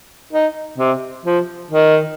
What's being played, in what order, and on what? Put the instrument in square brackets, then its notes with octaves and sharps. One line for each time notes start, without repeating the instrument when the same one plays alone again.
[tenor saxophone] D#4
C3
F3
D#3